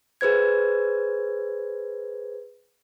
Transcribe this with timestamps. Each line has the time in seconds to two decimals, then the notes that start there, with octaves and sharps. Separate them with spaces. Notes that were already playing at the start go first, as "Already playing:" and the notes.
0.21 G#4 B4 C5 G#6